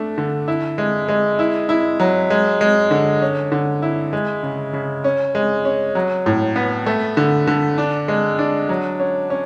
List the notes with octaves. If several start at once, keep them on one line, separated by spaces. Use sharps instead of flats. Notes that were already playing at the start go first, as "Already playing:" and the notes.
Already playing: A3 D4
D3
E4
G#3
G#3
E4
E4
F#3
G#3
G#3
D3
C#4
D3
E4
G#3
C#3
C#3
C#4
G#3
C#4
F#3
A2
B3
A3
D3
D3
D4
G#3
D4
F#3
C#4
C#4